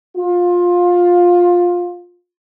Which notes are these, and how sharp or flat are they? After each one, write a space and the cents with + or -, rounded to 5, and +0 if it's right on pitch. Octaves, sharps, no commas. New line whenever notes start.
F4 +15